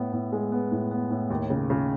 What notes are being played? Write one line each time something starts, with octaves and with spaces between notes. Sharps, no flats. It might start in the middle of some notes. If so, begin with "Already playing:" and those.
Already playing: A2 B3
A2
G#3
B3
A2
B3
A2
D#2
C#3
C#3